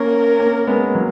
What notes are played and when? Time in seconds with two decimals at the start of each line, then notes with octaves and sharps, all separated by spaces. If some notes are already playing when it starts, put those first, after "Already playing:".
Already playing: A#3 C#4 A#4
0.39 A#3 C#4
0.67 G#3 B3
0.95 F#3 A#3